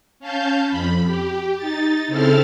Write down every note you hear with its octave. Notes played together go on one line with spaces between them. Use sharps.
C#4 F5 A5 G6
F2 B5
G4
D#4 A6
C#3 C4 E4 A4 F6 A6